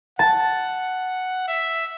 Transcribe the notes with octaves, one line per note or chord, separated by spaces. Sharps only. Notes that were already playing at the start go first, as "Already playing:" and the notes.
F#5 A5
E5